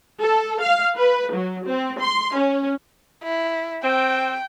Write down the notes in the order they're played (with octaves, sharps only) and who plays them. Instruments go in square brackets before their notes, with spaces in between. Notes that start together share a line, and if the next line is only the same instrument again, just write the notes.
[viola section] A4
F5
B4
F#3
C4
C6
C#4
[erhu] E4
[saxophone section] C4 [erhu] G5